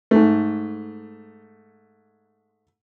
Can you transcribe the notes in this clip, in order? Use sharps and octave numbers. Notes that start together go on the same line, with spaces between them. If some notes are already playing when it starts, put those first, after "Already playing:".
G#2 A3